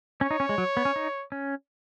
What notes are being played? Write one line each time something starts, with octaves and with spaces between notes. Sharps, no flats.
C#4 C#5
D#4
C#4
G#3
F#3
B3
C#4
D#4
C#4